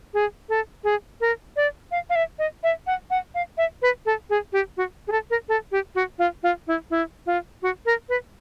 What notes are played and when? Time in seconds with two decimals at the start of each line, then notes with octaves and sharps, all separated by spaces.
0.14 G#4
0.49 A4
0.84 G#4
1.21 A#4
1.56 D5
1.91 F5
2.10 F5
2.16 E5
2.39 D#5
2.63 E5
2.87 F#5
3.10 F#5
3.35 F5
3.58 E5
3.82 B4
4.06 A4
4.30 G#4
4.53 G4
4.77 F#4
5.08 G#4
5.12 A4
5.30 A#4
5.49 A4
5.72 G4
5.95 F#4
6.19 F4
6.43 F4
6.67 E4
6.91 E4
7.26 F4
7.62 F#4
7.86 A#4
8.09 B4